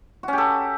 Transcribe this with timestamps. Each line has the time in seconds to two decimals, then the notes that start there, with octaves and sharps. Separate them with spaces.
0.23 F#4
0.28 C#4
0.33 G4
0.38 A4